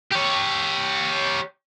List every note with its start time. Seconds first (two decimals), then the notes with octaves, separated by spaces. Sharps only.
0.12 G4 C#5